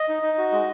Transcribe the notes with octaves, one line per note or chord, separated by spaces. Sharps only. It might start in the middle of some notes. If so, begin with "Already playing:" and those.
Already playing: D#5
D#4
D#4
F#4
G#3